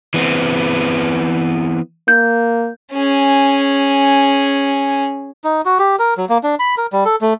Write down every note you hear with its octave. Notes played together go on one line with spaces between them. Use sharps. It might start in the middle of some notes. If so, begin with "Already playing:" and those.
E3 B3 C4
A#3 G6
C#4 G#4
D#4
F#4
G4
A#4
F#3
A#3
D4
B5
A#4
G3
A4
A3